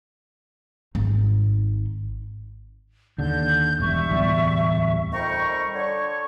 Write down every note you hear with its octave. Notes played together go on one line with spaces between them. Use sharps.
G#1 D#4
D#2 D3 G6
E1 G2 E5 C#6
D1 E2 G3
F2 D#3 G3 G5 A#5 C#6
D3 C#5 C#6